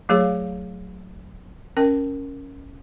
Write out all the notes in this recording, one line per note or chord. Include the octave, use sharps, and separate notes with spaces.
F#3 A3 G#4 C#5 F5
C#4 A#4 G5